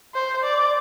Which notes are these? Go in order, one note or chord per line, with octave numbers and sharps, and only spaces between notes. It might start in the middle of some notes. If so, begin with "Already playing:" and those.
C5
D5